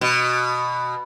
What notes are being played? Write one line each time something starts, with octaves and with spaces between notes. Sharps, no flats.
B2